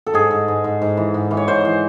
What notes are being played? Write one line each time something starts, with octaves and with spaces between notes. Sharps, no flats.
A4
G#2 G#4
G#2
G#2
G#2
G#2
E3
G#2
E3
C#5
G#2 C5
E3